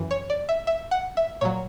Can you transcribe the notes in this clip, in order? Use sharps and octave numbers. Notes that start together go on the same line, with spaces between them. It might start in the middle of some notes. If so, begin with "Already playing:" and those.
Already playing: F#2 E3
C#5
D5
E5
E5
F#5
E5
A#2 F#3 C#5